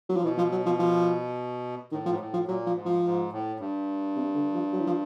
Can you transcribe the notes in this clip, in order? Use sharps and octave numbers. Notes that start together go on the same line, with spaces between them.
F#3
F3
B2 E3
F3
F#3
F3
F3
A2 D#3
F3
G#2
A2
F3
A#2 F#3
F3
G#2
F3
G#2
A2
G2
C3
D3
F3
F#3
E3
F3